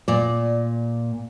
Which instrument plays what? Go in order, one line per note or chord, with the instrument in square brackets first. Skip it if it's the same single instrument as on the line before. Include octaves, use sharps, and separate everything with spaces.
[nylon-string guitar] A#2 D5